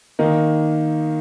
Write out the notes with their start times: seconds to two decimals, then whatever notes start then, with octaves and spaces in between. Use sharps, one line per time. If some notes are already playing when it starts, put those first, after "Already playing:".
0.19 D#3 A#3 D#4